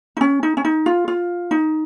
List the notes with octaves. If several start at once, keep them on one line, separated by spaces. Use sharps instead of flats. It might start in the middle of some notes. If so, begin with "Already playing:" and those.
D#4
C#4
D#4
C#4
D#4
F4
F4
D#4